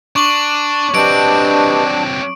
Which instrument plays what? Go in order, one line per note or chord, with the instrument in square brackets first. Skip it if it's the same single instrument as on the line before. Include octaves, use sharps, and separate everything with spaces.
[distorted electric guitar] D4 [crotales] C#6 D6 F#7
[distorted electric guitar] F#3 C4 [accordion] D4 [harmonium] G4 B4 D#5 [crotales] D7